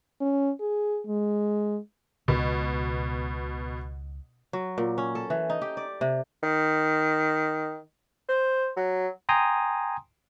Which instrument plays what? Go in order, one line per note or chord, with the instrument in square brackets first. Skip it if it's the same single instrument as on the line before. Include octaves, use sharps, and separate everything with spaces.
[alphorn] C#4
G#4
G#3
[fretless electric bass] C#2 [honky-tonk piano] B2
[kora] F#3
A#2
C#4
A4
E3
D#4
G4
D5
C3
[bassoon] D#3
C5
F#3
[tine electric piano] G5 G#5 A#5 C6 D#6